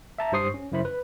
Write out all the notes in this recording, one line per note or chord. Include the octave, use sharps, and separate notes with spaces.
E5 A5 A#5
G2 G4 C5 C#6 D#6 C7
C#4
F#2 C#3 E4 C5 B5
B4